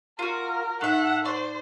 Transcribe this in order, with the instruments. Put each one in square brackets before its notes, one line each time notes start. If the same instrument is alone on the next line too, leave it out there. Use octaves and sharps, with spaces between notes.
[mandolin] F4 F#4 [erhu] A#4
[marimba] A2 D#4 F#6 [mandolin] A4 E5 [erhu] F#5
[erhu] C5 [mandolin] D5 [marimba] C#6